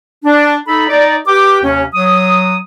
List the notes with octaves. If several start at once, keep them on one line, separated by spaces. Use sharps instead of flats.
D4
D#4 A4 B5
D#4 D5
G4 B4 G5 D6
D#2 C3 C#4
F#3 D#6